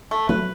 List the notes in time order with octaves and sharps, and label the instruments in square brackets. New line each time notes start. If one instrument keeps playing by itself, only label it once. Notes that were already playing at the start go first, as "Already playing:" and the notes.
[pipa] A3
[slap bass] F#3 A3 [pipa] B4